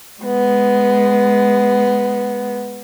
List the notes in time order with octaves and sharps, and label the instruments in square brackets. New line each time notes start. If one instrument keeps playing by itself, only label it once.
[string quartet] G#3 B3